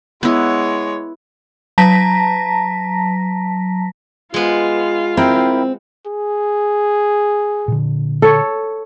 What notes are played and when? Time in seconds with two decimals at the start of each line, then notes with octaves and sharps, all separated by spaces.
0.23 G#3 B3 E4 C#5
1.78 F#3 A5 A#5 A#6 B6
4.34 G#3 B3 F4
5.17 C4 E4 A#4 G5
6.06 G#4
7.68 A#2 D3
8.22 A4 C#5